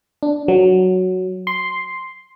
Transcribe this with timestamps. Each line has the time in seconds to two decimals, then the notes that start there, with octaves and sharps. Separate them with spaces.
0.23 D4
0.48 F#3
1.47 C6